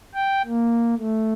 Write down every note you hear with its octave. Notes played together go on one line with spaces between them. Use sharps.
G5
A#3
A3